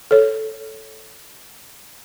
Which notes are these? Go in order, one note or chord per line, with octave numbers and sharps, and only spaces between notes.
A4 C#5